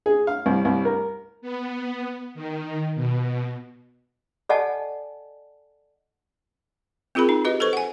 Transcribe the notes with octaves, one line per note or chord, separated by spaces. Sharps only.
G#4
F5
C2
C2
A#4
B3
D#3
B2
A4 D5 D#5 F#5 G#5 A5
C4 F4 G#4 A#4 B5
D#4
F#4 G4 B4 D#5
A4 B4 C5 C#6
F#5 G#5